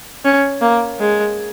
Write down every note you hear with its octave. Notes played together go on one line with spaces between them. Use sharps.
C#4
A#3
G#3